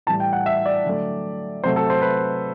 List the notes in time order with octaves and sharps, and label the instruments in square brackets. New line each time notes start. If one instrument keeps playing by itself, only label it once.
[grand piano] A2 E3 G3 A5
G5
F#5
E5
D5
D3 F#3 A3
C3 F#3 A3 C5
A4
C5
B4